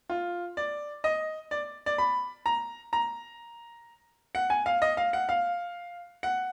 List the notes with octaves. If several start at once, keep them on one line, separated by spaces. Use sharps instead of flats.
F4
D5
D#5
D5
D5
B5
A#5
A#5
F#5
G#5
F5
D#5
F5
F#5
F5
F#5